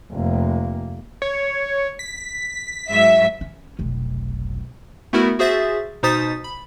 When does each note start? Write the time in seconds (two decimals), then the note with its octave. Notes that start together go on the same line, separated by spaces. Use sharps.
0.12 F1 A#3
1.22 C#5
1.99 B6
2.90 G#2 F#3 E5
3.41 C#4
3.79 F1 B1
5.13 A3 B3 E4 F#4 A#4
5.39 F#4 G#4 C5 E5 A6
6.03 B2 D#4 C5 D#6 A6 B6
6.44 B5